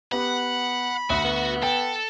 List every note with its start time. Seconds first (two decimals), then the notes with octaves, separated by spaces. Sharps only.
0.12 B3 G4 B4 F#5 B5
1.10 D2 F#4 F#5
1.25 B3
1.63 A4 G5